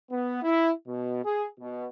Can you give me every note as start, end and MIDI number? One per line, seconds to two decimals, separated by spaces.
0.10 0.43 59
0.43 0.70 64
0.87 1.21 47
1.24 1.47 68
1.60 1.86 47